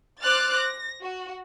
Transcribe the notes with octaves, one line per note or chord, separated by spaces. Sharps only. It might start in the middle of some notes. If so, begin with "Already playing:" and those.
C5 D6 F6 F#6 A6
A#6
F#4